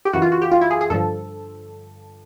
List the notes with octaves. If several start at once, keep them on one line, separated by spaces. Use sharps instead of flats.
G4
F#2 C#3 E3 F#4
F4
F#4
G4
F4
E4
G#4
G#4
G2 D3 F3 A4